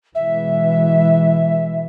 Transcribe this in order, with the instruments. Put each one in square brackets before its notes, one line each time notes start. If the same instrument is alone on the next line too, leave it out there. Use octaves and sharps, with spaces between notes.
[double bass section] B2 E3 G#3 [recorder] E5